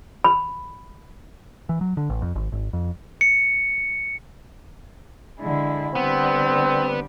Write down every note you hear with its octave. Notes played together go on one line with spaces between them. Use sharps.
B5
E3
F#3
D3
A1
F2
G#1
G#1
F2
C#7
D3 G#3 E4
D3 G3 B3 C4